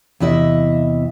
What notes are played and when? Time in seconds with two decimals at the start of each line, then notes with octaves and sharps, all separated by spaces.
0.20 E2 C3 E4 D#5 E5